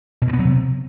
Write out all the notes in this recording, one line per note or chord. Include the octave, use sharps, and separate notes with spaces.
B2
G2
B3
F#3
C3